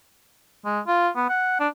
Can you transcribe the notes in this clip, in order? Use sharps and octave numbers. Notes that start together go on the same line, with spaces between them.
G#3
F4
B3
F#5
D4